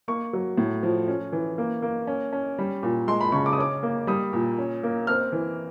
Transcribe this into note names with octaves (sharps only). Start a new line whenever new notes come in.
A#3 C#6
F#3
A2
F3
C#4
E3
A#3
A#3
C#4
C#4
G3
A#2
G#3 C6
B5
C#3 C#6
D6
D#6
C#4 D6
A#3
G3 D#6
A#2
C#4
A#3
C4 F6
E3